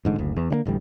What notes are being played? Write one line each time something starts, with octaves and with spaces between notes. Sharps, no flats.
A1 G#2 D3
F#1 D2
E2
D3 G#3 A#3
D1 A1 D2 G3